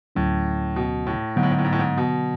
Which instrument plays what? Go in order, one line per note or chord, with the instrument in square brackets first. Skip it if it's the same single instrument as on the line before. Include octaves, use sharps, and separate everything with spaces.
[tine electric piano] D2 D3 F#3 C#4 [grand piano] A2
[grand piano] B2
A2
[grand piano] G#2 [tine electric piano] D3 F#3 B3
[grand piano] A2
G#2
A2
G#2
A2
G#2
B2